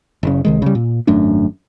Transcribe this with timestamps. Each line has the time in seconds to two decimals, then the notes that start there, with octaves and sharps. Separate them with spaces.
0.23 F#1 C#3
0.45 C2 D#3 G#3
0.62 C#3 G3
0.75 A#2
1.07 G#1 F#2 A3 D4